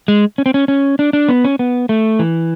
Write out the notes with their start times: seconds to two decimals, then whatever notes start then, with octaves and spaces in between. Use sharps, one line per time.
0.08 G#3
0.38 C#4
0.46 C4
0.54 C#4
0.68 C#4
0.99 D4
1.13 D4
1.29 B3
1.45 C#4
1.59 B3
1.89 A3
2.19 E3